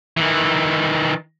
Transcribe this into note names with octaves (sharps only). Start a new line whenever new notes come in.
D#3 E3